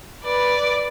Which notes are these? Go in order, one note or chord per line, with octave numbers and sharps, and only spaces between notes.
B4 D5